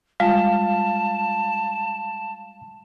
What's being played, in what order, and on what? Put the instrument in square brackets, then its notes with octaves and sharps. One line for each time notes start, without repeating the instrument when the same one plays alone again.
[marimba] G3 G#3 F4 [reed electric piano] F5 [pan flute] A5